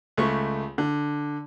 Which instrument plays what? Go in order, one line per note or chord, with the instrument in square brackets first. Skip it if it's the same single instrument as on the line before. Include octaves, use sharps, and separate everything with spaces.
[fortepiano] C#2 A3 C#6
D3